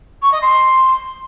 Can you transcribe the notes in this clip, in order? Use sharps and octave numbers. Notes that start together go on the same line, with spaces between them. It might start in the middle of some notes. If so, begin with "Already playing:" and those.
C#6
D#5
C6